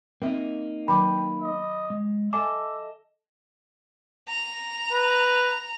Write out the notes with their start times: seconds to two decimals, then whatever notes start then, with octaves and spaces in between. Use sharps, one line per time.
0.22 A#3 C4 D#4 E5
0.88 D#3 F#3 G5 B5 D6
1.42 D#5
1.90 G#3
2.33 A4 D#5 E5 G#5 A5 D6
4.28 A#5
4.92 B4